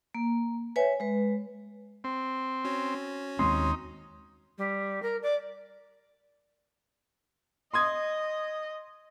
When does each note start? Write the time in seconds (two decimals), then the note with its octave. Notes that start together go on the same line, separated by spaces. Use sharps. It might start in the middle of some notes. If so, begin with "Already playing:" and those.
0.15 A#3
0.76 B4 C#5 E5 G#5
1.00 G#3 B4
2.04 C4
2.64 C#4 F#4 C#5
3.39 D#2 G#3 C4 D#4 C6
4.58 G3
5.02 A#4
5.22 D5
7.74 D#5 C6 D#6 G#6